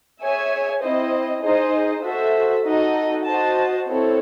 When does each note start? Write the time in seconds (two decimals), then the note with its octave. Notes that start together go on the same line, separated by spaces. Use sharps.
0.22 G#4 C#5 E5 G#5
0.82 C4 E4 C5 D#5
1.43 D#4 G#4 C5 D#5
2.04 F#4 A4 C5 E5
2.65 D#4 F#4 A4 D#5
3.25 F#4 C5 D#5 A5
3.87 C4 E4 A4 C#5